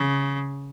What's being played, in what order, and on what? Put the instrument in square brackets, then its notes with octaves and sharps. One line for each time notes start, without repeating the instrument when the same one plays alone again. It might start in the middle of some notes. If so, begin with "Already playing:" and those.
Already playing: [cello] C#3